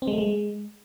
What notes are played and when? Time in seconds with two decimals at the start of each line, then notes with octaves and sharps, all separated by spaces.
0.02 C4
0.07 G#3
0.13 A3
0.18 G#3